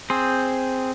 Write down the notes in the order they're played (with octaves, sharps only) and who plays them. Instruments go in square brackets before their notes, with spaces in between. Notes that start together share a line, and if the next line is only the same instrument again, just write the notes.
[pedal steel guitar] C4 G#4 C5